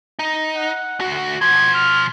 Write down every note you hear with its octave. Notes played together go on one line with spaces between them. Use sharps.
D#4
F#5
D2 F#4
B2 F3 G#6
F6